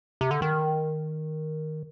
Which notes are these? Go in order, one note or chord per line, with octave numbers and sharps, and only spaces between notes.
C3
D3
D#3